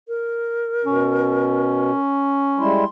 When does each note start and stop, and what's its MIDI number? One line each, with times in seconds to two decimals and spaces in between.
0.08 1.99 70
0.84 1.91 47
0.84 2.81 61
2.59 2.85 55
2.59 2.85 56
2.59 2.85 64
2.59 2.88 84